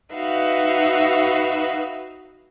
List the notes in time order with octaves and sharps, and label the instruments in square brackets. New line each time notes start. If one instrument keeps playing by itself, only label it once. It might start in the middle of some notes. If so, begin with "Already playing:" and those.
[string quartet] D#4 F#4 B4 E5 F5